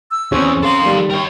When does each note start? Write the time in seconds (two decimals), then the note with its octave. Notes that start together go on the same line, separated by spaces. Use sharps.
0.11 E6
0.32 E2 C4 C#4
0.63 A4 F5 C6
0.81 D#3 G3
1.10 A#4 C#5 G5